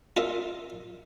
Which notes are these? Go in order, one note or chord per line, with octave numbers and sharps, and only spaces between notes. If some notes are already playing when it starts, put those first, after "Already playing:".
F4 A#4 D#5 E5